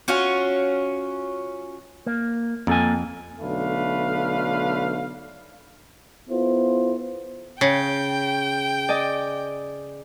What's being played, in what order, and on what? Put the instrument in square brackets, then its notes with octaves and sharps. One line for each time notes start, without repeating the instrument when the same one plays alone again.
[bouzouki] C#4 F4 F#4
[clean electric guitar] A#3
[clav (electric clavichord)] F2 [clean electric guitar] A#3 A4 G#5
[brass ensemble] B1 D3 A3 B4 F5
[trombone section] B3 E4 F4 A4 C5
[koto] C#3 [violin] G5
[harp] D5 D#5 G#5